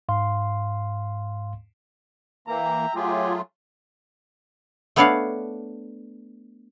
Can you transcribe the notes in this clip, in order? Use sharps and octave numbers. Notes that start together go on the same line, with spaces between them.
G#2 F5 C6
E3 A#3 E5 G5 A#5
F#3 A3 F4 G4 G#4
A3 B3 D4 C#5 D5 F5